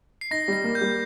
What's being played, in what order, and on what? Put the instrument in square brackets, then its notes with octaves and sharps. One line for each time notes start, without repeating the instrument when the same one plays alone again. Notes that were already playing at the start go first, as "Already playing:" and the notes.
[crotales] C7
[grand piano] D#4 [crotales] A#6
[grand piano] G3 [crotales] A#6
[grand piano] A#3
[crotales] G6
[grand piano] G3